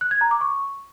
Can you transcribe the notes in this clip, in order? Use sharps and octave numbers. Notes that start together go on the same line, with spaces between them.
F#6
G#6
A#5
D6
C#6